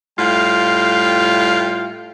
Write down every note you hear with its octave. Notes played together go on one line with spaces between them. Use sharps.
A2 G3 F4 F5 G5